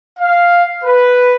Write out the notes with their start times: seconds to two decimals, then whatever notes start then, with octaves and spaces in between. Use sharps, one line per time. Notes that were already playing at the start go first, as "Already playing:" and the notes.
0.19 F5
0.84 B4